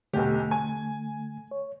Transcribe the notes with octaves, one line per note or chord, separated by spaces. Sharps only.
B1 E2 D3 A3 G4
G#5
C#5